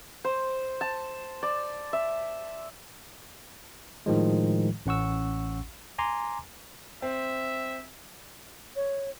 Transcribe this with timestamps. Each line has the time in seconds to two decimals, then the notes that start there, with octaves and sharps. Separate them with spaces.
0.24 C5
0.81 A5
1.43 D5
1.93 E5
4.06 A2 D#3 F3 G#3
4.86 A1 C#4 F#5 C#6 E6
5.98 G#5 A#5 C6 D6
7.02 C4 E5
8.76 C#5